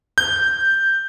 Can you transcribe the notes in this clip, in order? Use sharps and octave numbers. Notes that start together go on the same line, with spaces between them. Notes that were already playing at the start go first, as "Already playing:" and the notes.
G6